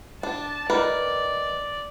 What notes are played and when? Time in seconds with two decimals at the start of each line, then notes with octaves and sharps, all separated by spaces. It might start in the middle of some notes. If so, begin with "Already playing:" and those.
0.23 D4 A5
0.70 D#3 A#4 B4 D5